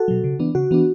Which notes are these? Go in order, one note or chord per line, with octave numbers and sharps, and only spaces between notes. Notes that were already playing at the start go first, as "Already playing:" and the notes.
Already playing: F#4 A4
B2 F#3
C#3
E3 B3 D4
C#3 F#4
E3 B3 D4